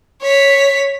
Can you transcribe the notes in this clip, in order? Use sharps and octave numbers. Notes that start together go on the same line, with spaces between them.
C#5 B6